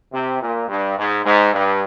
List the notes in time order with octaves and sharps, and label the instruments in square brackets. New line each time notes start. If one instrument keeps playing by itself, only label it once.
[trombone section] C3
A#2
G2
G#2
G#2
G2